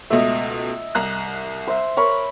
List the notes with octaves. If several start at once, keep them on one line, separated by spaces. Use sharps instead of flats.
C#2 B2 A3 D#5 E5
C2 A#5 F#6
C5 E5
A#4 C#5 B5